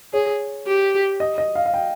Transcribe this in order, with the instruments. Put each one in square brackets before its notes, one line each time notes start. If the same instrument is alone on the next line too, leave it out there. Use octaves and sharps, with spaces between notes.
[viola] G#4 [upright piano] C#5
[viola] G4
[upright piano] D#5
D#5
F5
F5
G5